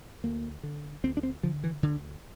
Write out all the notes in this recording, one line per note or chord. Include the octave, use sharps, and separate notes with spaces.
D2 A#3
D3
D2 C4
D4
C4
D3 F3
E3
D2 D3